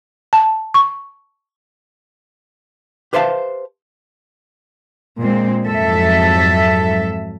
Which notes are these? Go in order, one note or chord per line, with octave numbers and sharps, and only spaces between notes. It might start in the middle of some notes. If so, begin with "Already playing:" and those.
A5
C#6
G4 B4 C5 E5 F5 A5
A#2 G#3 C4
F2 G#2 F#3 A4 E5